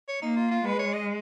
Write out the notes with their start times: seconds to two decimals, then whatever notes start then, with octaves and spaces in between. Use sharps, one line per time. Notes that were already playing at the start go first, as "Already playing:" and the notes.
0.08 C#5
0.22 A#3 D#4
0.36 F4
0.51 F4
0.65 G#3 B4
0.79 C#5
0.93 D#5